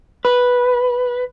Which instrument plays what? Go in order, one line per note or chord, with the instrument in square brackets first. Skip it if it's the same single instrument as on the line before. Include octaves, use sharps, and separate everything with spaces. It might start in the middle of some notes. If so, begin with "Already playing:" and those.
[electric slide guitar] B4